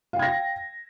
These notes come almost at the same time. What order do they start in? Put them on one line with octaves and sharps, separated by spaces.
F5 G5 G#6 A#6